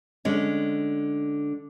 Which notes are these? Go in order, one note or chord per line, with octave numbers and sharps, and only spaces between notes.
D3 G#3 C#4